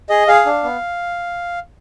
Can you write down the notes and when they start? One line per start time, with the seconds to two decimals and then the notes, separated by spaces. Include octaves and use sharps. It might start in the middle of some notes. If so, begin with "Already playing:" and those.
0.09 G#4 D#5
0.27 G#4 F5
0.46 D4
0.64 B3